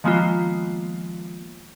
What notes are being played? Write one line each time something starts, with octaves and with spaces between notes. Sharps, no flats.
D#3 F3 G#3 A#3 B3 F4